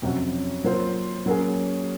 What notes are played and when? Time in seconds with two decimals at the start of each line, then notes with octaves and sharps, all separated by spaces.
0.02 F2 C3 F#3 C#4 F#4
0.64 F#3 A#3 F4 C5
1.26 F#3 A#3 C#4 G#4